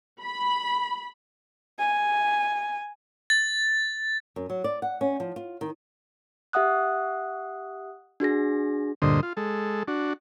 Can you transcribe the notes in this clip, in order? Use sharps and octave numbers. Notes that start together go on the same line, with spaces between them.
B5
G#5
A6
F#2
F#3
D5
F#5
C#4
F3
F4
D#3
G4 E5 F#5 D#6 F#6
D4 F#4 G#4 A#6
D2 G2 A#2 D3 C5 D#5
F4
G#3 A4
D4 F#4